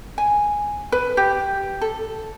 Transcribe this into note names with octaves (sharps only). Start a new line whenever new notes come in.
G#5
B4
G4
A4